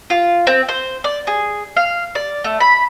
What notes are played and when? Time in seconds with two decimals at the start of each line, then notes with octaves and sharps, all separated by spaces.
0.10 F4
0.47 C4
0.69 C5
1.04 D5
1.27 G#4
1.76 F5
2.15 D5
2.44 A3
2.60 B5